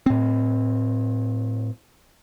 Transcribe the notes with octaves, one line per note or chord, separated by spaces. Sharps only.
A2 C4